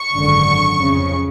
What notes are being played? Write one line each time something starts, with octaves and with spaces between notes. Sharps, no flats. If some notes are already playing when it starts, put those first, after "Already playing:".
Already playing: C#6
G#1 F#2 D3
F2 C#3